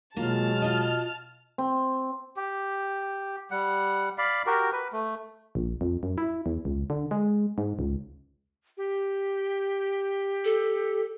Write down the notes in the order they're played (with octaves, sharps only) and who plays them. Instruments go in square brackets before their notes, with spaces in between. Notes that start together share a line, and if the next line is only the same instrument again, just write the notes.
[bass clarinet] B2 [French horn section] F#3 G#3 [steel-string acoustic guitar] A#3 F4 [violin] A5 F6
[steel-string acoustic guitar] F4 D#5
[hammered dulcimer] C4
[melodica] G4
G3 F#5
D5 F5 B5
F#4 G4 A#4
B4
A3
[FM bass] A#1
F2
F#2
E4
E2
C#2
D3
G#3
G#2
C#2
[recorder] G4
[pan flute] A4